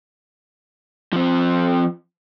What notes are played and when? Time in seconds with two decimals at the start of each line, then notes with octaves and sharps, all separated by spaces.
1.13 F3 C4